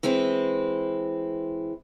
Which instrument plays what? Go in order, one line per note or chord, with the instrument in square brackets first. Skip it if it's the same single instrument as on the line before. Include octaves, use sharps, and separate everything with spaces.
[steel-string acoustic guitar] E3 G#3 C4 E4